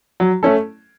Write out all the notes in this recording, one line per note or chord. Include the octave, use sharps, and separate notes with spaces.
F#3
A3 C#4 A4